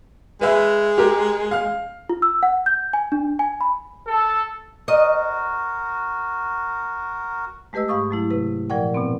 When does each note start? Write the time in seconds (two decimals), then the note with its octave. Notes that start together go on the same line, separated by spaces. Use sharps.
0.41 G#3 B4 E5
0.98 G4 A#4
1.51 F5 F6
2.09 F4
2.22 E6
2.43 F#5
2.66 G6
2.93 G#5
3.12 D4
3.39 G#5
3.61 B5
4.06 A4
4.88 F#4 A#4 D#5
7.73 G#3 A3 G4 B4 D#5 E6
7.88 G#2 G4 F5 C#6 D#6
8.11 F#3 A3 E4
8.31 C3 B4
8.70 A#2 F3 A#4 D5 F#5 G5
8.94 B2 B3 C4